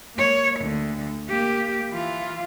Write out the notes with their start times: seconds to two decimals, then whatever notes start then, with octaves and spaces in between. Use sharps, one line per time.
0.14 A#3 C#5
0.60 D2 D3
1.28 A#3 G4
1.90 E3 F4